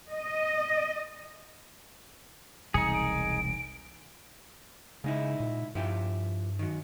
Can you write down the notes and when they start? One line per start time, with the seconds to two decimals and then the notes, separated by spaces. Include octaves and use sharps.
0.12 D#5
2.74 E1 C2 D#4 G#4 C#7
2.94 D7
5.04 G#2 C#3 D#4 E4
5.40 A#2
5.75 G2 F3 E4 G4
6.59 D#3 F#3